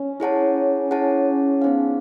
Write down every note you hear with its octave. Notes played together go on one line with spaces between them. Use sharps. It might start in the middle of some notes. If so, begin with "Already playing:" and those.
Already playing: C#4
E4 G#4 C#5 F#5 A5
E4 G#4 C#5 F#5 A5
B3 D#4 G#4 C5 F5